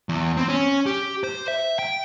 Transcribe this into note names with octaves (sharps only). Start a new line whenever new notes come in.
E2
C4
C#4
G4
C5
E5
G5